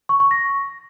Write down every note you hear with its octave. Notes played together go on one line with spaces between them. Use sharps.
C#6
C#6
A#6